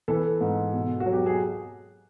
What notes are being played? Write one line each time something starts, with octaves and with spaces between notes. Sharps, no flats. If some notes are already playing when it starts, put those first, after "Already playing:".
E3 A4 B4
G#2
B2
F#4
F#3
G4
G#4